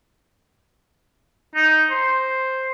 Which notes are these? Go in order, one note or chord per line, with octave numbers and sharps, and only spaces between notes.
D#4
C5